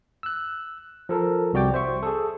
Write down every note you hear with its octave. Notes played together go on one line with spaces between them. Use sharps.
E6 F#6
F3 A4 A#4
C2 C3 F#4 D5 G5 D6
C5 E5 C#6
G#4 A4